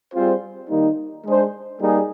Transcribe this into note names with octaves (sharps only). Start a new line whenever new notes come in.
G3 C4 F4 G#4 C5
D#3 G3 A#3 D#4
G#3 D4 G#4 C5
G3 A#3 D#4 G#4